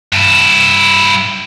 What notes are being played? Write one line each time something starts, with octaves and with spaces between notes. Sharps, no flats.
G2 E4